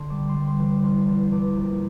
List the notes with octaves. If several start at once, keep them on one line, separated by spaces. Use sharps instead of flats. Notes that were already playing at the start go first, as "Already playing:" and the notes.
Already playing: D3 C6
G3 D6
C6
G3
C6
E3
D6
E2 C6
E2 C6
E2 D6
A#1